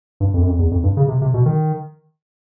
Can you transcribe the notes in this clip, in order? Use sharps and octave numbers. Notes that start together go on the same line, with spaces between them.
G2
F2
F#2
F2
E2
F2
G2
C#3
C3
C3
B2
D#3